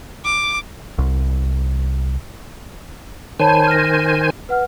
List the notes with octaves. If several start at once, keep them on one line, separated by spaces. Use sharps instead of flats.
D6
C2
D#3 C5 C#5 G#5 A5 B5
F6 A#6
B4 F#5 F6